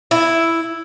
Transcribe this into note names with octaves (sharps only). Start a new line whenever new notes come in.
E4